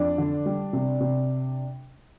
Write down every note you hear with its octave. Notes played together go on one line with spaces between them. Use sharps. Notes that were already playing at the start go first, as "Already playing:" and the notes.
Already playing: F2 D4
D3
G3
C3
C3